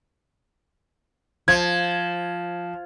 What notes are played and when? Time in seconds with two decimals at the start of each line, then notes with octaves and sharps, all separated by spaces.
1.48 F3 G#6